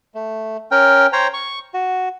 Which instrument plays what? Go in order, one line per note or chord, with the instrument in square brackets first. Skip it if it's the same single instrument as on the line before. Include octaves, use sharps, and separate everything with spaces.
[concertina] A3
C#4 A#4 G5
C5 C#5 G5 A#5
C#6
F#4